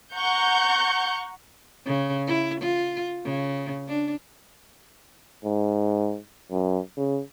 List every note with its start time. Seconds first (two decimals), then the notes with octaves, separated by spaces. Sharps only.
0.14 F#5 A#5 C#6 G6 C#7
1.86 C#3
2.27 E4
2.61 F4
3.24 C#3
3.88 D4
5.45 G#2
6.51 F#2
6.97 C#3